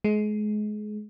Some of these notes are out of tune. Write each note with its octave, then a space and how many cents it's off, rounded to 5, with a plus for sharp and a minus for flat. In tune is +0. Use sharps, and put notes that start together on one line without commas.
G#3 +30